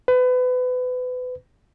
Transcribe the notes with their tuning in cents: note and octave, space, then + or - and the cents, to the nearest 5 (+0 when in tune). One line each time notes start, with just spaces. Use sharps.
B4 +30